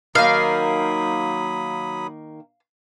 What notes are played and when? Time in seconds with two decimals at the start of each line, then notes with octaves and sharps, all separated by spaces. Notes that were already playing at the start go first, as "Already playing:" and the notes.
0.15 D#3 F#3 A#3 F5 B5 D#6